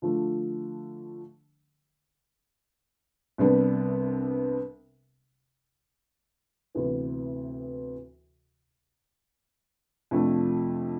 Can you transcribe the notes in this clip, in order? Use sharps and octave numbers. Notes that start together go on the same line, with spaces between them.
D3 F3 A3
C2 C3 G3 B3 D4
D2 C3 E3 B3
F2 C3 F3 A3 D4